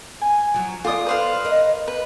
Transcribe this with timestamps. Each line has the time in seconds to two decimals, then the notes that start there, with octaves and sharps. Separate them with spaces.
0.21 G#5
0.54 F3 F#3
0.85 F4 A4 D5 D6 D#6
1.07 B4 C5 F5
1.44 A#4 D#5
1.88 B4